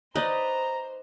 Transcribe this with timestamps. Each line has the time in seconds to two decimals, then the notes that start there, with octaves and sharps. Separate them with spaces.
0.15 D#4 B4 C5 D5 D#5 A#5